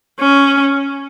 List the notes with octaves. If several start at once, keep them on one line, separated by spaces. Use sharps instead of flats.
C#4